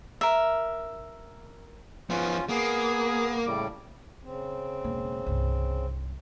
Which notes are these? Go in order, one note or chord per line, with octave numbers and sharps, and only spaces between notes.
A#4 E5
F3 B3 C#4 F4
A#3 B3 G#4
A2 C#3 G3 D6
C#3 C4
E1 A#3
C2 G2